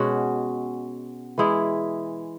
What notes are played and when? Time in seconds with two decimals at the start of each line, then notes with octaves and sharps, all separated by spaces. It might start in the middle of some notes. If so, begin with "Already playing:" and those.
Already playing: B2 G#3 C#4 F#4
1.38 E3 G#3 E4 G#4